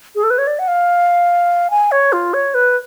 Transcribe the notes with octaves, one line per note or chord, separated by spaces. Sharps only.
G#4
A4
B4
C#5
D5
F#5
F5
G#5
C#5
F4
C#5
B4